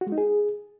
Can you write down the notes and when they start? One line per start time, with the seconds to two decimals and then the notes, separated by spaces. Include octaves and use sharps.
0.01 F#4
0.07 G#3
0.12 D#4
0.18 G#4